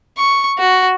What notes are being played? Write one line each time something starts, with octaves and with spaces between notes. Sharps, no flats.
C#6
F#4